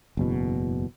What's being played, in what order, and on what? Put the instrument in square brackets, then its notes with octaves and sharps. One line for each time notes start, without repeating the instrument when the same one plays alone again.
[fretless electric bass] F#1 E2 B2